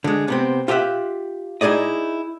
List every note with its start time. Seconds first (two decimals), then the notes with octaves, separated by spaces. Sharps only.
0.04 D3 G#3
0.28 C3 B3 C4
0.68 F4 G4 A#4 D#5 E5 F#5
1.61 D#4 E4 G#4 D5 D#5